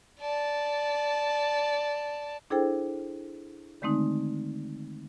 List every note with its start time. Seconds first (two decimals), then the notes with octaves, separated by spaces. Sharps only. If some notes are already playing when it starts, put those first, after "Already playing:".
0.20 D5 A5
2.50 D4 E4 G#4 A4 C5 G5
3.82 D3 D#3 G#3 A3 C4 D#4